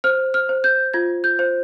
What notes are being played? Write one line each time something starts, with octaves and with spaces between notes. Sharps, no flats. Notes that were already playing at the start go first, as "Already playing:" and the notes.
C5 F6
F6
C5
G6
F4 G#6
G6
C5